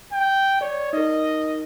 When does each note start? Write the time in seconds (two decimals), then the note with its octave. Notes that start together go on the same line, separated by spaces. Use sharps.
0.12 G5
0.61 C#5 D5
0.93 D#4 A#4 D#5